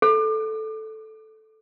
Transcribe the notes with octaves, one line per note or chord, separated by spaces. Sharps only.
A4